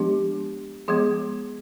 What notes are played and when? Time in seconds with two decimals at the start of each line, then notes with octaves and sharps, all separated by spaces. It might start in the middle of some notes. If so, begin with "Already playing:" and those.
Already playing: F3 G#3 B3 D4 G4
0.88 F3 G#3 B3 G#4